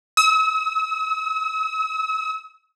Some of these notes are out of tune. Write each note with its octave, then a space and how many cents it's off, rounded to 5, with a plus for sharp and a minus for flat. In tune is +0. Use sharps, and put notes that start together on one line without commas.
E6 -45